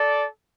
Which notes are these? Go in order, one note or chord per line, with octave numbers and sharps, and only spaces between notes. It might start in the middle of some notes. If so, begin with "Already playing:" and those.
Already playing: A4 D5